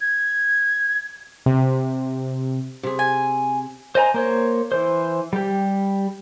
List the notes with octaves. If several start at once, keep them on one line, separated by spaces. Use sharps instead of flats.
G#6
C3
C3 G#4
G#5
C5 D#5 G#5 A#5
A#3 C5 C#5
E3 C5
G3 G4